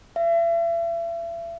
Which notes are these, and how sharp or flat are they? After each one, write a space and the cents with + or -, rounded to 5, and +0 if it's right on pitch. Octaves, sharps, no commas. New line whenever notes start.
E5 +40